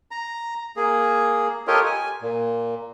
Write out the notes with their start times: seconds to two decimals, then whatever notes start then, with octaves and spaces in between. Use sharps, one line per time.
0.11 A#5
0.77 A#3 G#4
1.68 F4 G4 A4 A#4 C#5 D#5
1.86 G#5
2.22 A#2